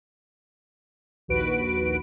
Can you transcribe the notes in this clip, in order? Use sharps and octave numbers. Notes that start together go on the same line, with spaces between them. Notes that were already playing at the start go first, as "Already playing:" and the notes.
A#1 D#2 F#4 B4 D7